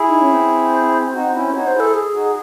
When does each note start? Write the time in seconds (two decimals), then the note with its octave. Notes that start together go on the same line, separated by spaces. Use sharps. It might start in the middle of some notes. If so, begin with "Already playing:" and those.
Already playing: E4 G#4
0.08 D#4
0.21 C#4
0.33 C4
1.13 D#4 F#4
1.33 C#4 E4
1.53 D#4 F#4 C#5
1.67 C5
1.74 E4 G#4
1.80 A4
1.94 G#4
2.13 D#4 F#4